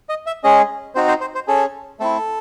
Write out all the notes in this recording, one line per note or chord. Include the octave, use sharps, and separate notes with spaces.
D#5
E5
G#3 C#4 G#4 D#5
C4 D#4 F#4 C5
C5
C5
C5
C#4 G#4 A4
A3 C4 E4 A4